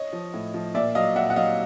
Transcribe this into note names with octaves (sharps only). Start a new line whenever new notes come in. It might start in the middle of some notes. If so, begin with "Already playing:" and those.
Already playing: C#5 D#5
F3
A2
F3
A#2 D5 E5
F#3 D#5 F5
A#2 E5 F#5
F#5
F#3 D#5 F5